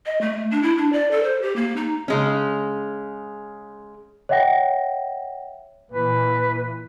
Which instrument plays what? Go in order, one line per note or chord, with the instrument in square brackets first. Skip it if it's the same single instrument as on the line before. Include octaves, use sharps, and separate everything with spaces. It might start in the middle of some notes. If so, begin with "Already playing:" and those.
[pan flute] D#5
A3
D4
E4
D4
D5
A4
C5
G4
A#3
D#4
[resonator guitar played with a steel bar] C#3 G#3 C#4
[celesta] C#5 D#5 E5 F#5 G5 A#6
[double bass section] A#2 E3 [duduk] B4